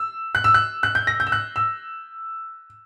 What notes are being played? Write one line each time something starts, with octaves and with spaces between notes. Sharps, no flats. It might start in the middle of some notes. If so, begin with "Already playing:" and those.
Already playing: E6
F#6
E6
F#6
F#6
G6
A#6
G6
E6
F#6
E6